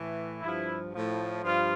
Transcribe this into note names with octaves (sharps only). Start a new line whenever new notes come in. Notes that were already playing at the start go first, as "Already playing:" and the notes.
Already playing: A2 E3
G2 F3 E4
A2 F3
G2 F3 F4